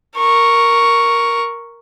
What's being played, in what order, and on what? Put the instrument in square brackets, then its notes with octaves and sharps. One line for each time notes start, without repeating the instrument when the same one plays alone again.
[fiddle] A#4 C#6